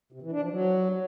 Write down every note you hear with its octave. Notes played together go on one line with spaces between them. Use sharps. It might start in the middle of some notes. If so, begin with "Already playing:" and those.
C3
E3
D4
F3
F#3